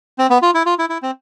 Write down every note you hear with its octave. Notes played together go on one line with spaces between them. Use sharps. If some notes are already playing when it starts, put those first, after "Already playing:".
C4
B3
F4
E4
F4
E4
E4
C4